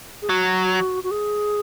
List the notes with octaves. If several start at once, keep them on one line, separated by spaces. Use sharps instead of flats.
G#4
F#3 F#4
F#4
G#4